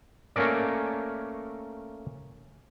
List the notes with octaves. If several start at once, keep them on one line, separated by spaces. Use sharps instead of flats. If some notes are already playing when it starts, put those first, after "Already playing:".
A3 A#3 C#4 A#4 D5